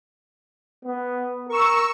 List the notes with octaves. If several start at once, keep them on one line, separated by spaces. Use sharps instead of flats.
B3
A#4 C#6 E6